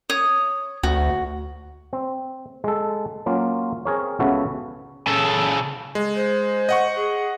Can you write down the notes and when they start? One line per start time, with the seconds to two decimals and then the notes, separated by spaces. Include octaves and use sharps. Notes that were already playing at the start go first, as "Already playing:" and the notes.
0.10 C#5 D#6
0.83 D2 F#4
1.93 C4
2.64 G#3 A4
3.26 F#3 A#3 C#4 F4
3.85 C4 G#4 A#4 C#5
4.19 C#2 C#3 B3 F#4 A4 E5
5.07 C#3 A4
5.95 G#3
6.15 C5
6.69 D#5 F#5 C#6
6.95 G#4